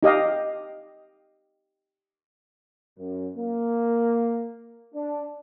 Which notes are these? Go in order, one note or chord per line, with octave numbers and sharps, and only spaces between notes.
D#4 G4 D#5 F5
F#2
A#3
D4